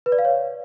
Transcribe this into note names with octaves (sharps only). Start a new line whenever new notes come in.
B4
D5
F5
C#5